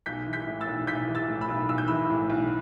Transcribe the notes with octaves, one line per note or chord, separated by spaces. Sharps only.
B1 G6 B6
E3
G6 B6
A2
E6 A6
B1
B1 G6 B6
E3
E6 A6
A2
B5 E6
B1
B1 E6
G6
E3 B5 E6
A2
B1